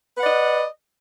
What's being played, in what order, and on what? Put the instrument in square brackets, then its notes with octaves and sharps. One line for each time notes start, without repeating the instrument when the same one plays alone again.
[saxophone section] B4
F#5
D5
D#5